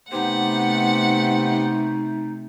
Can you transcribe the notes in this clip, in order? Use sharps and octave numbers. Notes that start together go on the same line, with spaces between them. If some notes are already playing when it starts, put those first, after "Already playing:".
C3 A3 B3 D#4 G4 C5 F#5